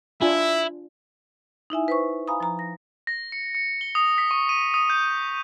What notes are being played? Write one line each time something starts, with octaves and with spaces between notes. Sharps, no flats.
D4 E4 F4 E5 G#5
D#4 E4 E5 G#5
B4 C5 C#6
F5 G#5 A#5 B5 D#6
F3 A#5
A#6
A#6
C#7
C#7
G7
D#6
B6
C#6
D#7
D#6
G6